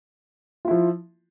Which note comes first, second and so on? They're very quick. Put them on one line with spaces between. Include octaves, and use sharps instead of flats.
F4 E4 F3